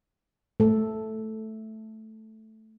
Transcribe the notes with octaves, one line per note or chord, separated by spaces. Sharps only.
A3 A4